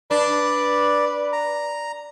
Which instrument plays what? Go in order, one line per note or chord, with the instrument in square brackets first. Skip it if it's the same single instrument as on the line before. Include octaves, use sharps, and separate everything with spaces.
[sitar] D4 [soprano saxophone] B4 [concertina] D5
[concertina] A#5